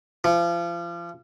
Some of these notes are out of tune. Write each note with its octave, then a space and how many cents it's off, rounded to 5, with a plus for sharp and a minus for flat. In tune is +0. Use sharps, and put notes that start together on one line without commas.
F3 -35